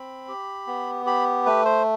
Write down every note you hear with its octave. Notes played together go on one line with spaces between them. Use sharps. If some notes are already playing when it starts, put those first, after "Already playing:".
Already playing: C4 B5
G4
B3
G4 B5
A3 B4
C5